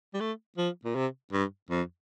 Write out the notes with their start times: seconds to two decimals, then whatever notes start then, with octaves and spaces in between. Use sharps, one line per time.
0.14 G3
0.20 A3
0.58 F3
0.85 A#2
0.95 C3
1.33 G2
1.70 F2